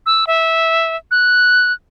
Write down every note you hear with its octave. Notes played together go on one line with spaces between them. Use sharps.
E6
E5
F#6